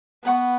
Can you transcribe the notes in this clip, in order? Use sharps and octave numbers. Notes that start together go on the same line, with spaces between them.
B3 B4 F#5 C#6